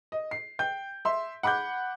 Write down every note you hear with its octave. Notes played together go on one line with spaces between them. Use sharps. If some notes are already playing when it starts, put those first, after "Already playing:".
D#5
C7
G5 G6
E5 C6
F#5 B5 D6 F#6 G6